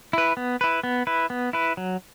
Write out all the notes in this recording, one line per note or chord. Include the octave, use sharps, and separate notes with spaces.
E4 B4
B3
E4 B4
B3
E4 B4
B3
E4 B4
F#3